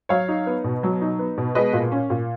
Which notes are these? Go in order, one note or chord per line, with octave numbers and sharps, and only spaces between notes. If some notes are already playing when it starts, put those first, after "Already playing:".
F#3 C#5 F5
D#4
B3
B2
F#3
D#4
B3
B2
G#3 B4 D#5
A#2
C#4
A#2